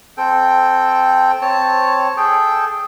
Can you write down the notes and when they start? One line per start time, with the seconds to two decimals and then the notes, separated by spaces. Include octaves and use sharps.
0.17 C4 A4 G5
1.42 C4 C#5 A5
2.17 G#4 A4 G5